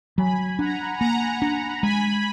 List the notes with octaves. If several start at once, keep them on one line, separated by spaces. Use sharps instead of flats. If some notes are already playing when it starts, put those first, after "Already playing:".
F#3 G#5 B5
D4 F#5 A#5
A#3 F#5 A#5
D4
G#3 G#5 B5